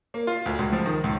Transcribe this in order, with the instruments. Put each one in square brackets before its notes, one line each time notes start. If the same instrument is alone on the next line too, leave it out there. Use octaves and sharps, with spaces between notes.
[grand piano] A#3
F4
D2
C#2
F3
D#3
C#2